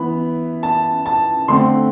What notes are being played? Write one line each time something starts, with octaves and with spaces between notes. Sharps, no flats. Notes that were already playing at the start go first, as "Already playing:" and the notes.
Already playing: E3 B3 B5
A5
A5
D3 A3 C4 C6